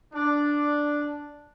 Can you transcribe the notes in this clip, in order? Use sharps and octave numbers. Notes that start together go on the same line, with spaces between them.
D4